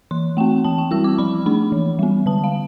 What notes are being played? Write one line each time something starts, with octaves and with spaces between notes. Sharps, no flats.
E3 C6
A3 C4 G5
E3 A5
G5
G3 C4 E4 E6
D6
F3 B5
A3 D4 B5
E3
G3 B3
D3 A5
F5